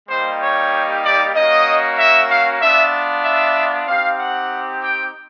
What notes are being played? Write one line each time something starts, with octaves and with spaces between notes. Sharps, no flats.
G3 A#3 D#4 G4 C5
C#5
D5
A#3 C#4 F#4 D#5
E5
F5
B3 D4 F4 E5
E5
C4 D#4 G4 F5
F#5
G5